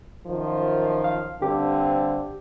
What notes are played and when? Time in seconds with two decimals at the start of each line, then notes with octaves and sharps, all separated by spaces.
0.27 F#2 D#3 F3
1.04 F5
1.42 G2 D3 C4 G4